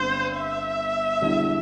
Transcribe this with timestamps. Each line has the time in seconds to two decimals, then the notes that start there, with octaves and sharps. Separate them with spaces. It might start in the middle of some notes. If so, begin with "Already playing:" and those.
Already playing: G1 G2 D3 C4 C5
0.37 E5
1.21 E1 E2 D3 G3 E4